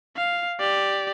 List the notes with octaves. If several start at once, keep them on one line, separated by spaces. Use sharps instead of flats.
F5
G4 D5